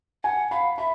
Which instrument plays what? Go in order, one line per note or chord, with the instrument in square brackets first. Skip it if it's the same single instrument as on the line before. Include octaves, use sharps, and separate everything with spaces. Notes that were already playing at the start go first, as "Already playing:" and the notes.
[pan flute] F#5 [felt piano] G#5
[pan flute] F5 [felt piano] B5
[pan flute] E5 [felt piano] B5